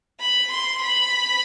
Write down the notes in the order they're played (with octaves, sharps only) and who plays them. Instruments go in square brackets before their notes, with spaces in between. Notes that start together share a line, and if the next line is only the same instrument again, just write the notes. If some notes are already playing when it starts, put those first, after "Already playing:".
[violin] B5
C6
B5